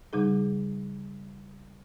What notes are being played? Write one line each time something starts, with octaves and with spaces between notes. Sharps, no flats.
C#3 G3 D#4 G#4